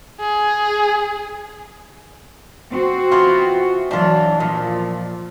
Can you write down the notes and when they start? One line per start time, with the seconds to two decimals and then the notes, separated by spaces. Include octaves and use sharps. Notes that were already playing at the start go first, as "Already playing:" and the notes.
0.20 G#4
2.71 C4 F#4
3.11 E3 B3 F4
3.91 E3 F#3 D4 F4
4.40 A#2 F3